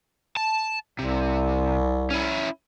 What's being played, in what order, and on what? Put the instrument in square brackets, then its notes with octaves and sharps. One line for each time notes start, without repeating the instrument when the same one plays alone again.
[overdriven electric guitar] A5
[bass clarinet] C2 [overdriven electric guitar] C3
[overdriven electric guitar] C#4 E4